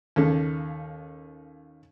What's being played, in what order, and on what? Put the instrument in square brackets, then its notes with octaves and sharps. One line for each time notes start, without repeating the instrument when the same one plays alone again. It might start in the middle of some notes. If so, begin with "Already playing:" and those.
[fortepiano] D#2 C#3 A4